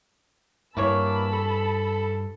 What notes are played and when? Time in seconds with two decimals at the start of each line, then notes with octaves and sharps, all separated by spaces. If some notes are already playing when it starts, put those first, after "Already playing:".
0.77 G2 E3 A#3 B4 C#5 A5 B5 E6
1.32 A4